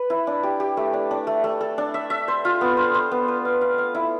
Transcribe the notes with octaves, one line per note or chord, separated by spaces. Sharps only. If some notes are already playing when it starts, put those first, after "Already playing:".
Already playing: B4
E4
D4
G4
G4
A3
D4
D4
A3
A3
A4
D4
E5
E5
C5
F4
B3
C5
C5
B3
B4
F5
F5
F5
E4